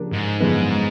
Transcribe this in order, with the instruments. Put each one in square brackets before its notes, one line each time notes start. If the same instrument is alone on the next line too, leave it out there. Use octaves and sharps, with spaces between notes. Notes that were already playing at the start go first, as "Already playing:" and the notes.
Already playing: [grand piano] C#3 F3 A#3 D4 G4
[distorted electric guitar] G#2
[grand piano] F#2 D3 F3 G#3 B3